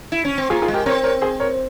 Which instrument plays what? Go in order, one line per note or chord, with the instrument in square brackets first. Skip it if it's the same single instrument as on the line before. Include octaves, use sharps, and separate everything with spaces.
[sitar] E4
C#4
C4
[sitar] A#3 [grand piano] F4 G#4
[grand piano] F4 G#4
[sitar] G#3
[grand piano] G4 A#4
[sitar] C4 [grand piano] A#4 C#5
[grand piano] A#4 C#5
G#4 C5
A#4 C#5